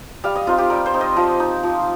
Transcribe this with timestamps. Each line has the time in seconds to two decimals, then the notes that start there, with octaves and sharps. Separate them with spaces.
0.24 G3 F5
0.35 D#5
0.47 C4 D#4 F4
0.58 G4
0.70 G3 A#4
0.86 C5
0.94 C4 D#4
1.01 D#5
1.16 F3 D#5
1.40 D#4
1.63 F3